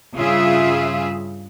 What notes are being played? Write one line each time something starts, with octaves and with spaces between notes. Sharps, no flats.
G2 C#3 F4 G#4 E5